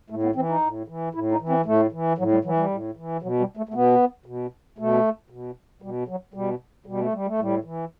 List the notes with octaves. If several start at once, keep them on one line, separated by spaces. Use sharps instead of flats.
A2 A3
B3
E3 C4
D#4
A2
E3
A2 E4
D#4
E3
C4
A2 A3
E3
A2 F#3
G3
E3 F#3
G3
A2
E3
B2 F#3
G3
A3
A3
B2 B3
B2
B2 A3
B2
B2 G3
F#3
B2 G3
B2 G3
A3
G3
A3
A2 G3
E3